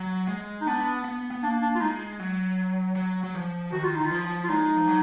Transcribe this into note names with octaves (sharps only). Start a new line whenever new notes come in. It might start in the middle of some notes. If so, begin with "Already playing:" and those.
Already playing: F#3
G#3
D#4
B3 D4
B3
B3
A#3 D4
D4
F4
G#3 D#4
F#3
F#3
F#3
F3
D#3 F#4
F4
D#3 D#4
F4
F3
F4
G#3 D#4
F3
F#3